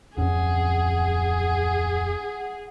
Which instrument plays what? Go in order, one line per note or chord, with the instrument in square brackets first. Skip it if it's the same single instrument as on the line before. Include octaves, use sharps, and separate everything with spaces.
[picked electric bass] D1 F2 C#4 [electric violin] G#4 [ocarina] F#5